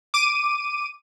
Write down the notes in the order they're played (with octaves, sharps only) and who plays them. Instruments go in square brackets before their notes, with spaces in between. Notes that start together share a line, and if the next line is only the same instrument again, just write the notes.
[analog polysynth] D6 D#7